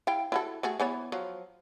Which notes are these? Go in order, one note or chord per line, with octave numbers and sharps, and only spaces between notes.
E4 F5 G5
E4 F#4 A4
A3 F#4 G#4
E3 B3 C#5
F3 F#3